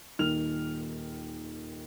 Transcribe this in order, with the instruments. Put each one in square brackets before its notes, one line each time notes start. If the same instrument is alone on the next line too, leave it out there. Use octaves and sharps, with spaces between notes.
[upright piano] D#1 D#3 F6 F7